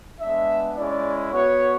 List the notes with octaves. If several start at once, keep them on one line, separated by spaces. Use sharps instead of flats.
G#3 B3 D4 E5
G#3 C#4 E4 D5
B3 F#4 C#5